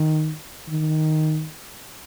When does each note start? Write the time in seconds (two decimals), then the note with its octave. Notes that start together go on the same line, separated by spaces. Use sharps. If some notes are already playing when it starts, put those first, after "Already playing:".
Already playing: D#3
0.69 D#3